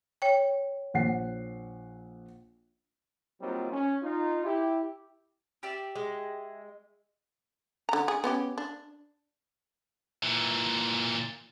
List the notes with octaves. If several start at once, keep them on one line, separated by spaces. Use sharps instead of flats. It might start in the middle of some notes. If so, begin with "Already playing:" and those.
C#5 G5
A#1 F#5 C7
F#3 G3 A#3 C4 D#4 F4
C#4
D#4 F4
E4 G4
G4 D5 E5
G#3
D3 A#5
G#4
B3 C#4 G4
D4
A#2 E3